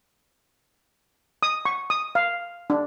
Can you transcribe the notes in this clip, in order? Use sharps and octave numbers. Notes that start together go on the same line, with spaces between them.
D#6
C#6
D#6
F5
D4